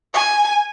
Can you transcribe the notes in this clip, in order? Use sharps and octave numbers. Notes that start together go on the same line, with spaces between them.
G#5